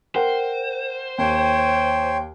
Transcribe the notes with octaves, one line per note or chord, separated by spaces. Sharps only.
A#4 C5 F#5 G5
D#2 C#5 G5 C6